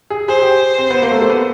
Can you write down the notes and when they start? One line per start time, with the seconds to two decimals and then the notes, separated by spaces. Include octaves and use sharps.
0.10 G#4
0.28 G#4 C5
0.42 G4
0.78 C4
0.90 B3
1.02 A#3
1.11 A3
1.21 A3
1.30 B3